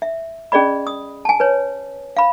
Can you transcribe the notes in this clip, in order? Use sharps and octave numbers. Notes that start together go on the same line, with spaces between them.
E5
C#4 G#4 D5 D#5 B5
D#6
G#5 A5
B4 C#5
F5 B5